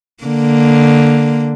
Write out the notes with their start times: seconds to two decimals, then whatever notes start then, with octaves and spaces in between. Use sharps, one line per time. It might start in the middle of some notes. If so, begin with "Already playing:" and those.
0.24 D3 A#3